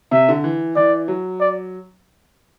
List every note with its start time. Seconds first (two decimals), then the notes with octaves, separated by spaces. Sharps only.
0.12 C3 E5
0.29 D3
0.44 E3
0.76 E3 D5
1.08 F#3
1.40 D5